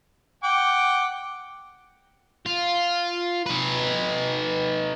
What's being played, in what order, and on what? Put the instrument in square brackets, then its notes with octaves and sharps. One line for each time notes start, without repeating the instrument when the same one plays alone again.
[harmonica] F#5 G5 D6
[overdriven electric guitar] F4
D#4 B4